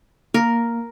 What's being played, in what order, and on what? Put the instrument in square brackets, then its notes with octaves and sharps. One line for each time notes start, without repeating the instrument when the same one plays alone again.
[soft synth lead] A#3 [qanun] A#4